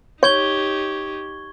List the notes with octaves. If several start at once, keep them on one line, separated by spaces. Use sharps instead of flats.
D#4 G4 C#5 C#6 G#6 G7